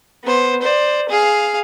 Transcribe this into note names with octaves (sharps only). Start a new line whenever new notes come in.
B3 C5
C5 D5
G#4 F5